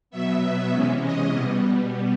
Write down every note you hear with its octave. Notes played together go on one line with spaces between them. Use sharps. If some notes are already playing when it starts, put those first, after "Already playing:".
B2 F#3 B3 E5
C3 E3 G#3 C#4
D#5
B2 G3 B3